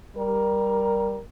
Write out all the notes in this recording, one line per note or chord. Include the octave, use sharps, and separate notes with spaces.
G3 A#4